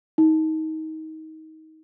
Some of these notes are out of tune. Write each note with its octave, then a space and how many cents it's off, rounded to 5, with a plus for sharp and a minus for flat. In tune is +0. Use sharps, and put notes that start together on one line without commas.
D#4 +25